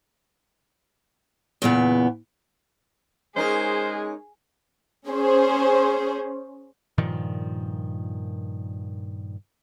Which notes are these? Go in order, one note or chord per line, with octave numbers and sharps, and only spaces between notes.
E2 A#2 C#3 B3
G#3 C#4 D#4 G#4 A#4 C5
C#4 G#4 C5
G2 A#2 D#3 F3